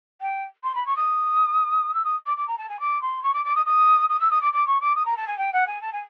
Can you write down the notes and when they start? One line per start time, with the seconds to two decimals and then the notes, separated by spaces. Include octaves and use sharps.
0.21 G5
0.63 C6
0.75 B5
0.86 C#6
0.96 D#6
1.93 E6
2.04 D#6
2.26 D6
2.37 D6
2.47 A#5
2.58 A5
2.69 G#5
2.79 D6
3.01 C6
3.23 C#6
3.33 D6
3.44 D6
3.55 D#6
3.66 D#6
4.09 D#6
4.19 E6
4.30 D#6
4.41 D6
4.52 D6
4.66 C#6
4.80 D6
4.95 D#6
5.05 A#5
5.17 A5
5.27 G#5
5.38 G5
5.53 F#5
5.67 G#5
5.81 A5
5.92 G#5